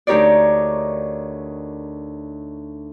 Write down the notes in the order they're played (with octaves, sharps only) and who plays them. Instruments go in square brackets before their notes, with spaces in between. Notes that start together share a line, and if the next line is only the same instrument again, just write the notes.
[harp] D2 D#4 G4 A#4 C#5 D5